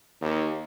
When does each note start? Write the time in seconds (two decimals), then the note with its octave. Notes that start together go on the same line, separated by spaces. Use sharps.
0.21 D#2